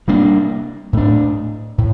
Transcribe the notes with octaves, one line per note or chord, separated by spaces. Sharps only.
C3 G3 A#3 D4
A2 A3 D4
A2